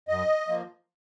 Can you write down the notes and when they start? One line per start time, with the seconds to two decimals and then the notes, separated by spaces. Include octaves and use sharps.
0.08 F#2 D#5
0.48 F3 A#3